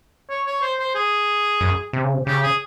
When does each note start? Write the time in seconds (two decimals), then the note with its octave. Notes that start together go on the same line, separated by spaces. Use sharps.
0.29 C#5
0.47 C#5
0.62 C5
0.79 C5
0.95 G#4
1.61 F#2
1.93 C3
2.04 C#3
2.13 C3
2.27 C#3 G4
2.43 G#4